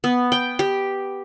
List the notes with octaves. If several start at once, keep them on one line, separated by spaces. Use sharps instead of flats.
B3
G5
G4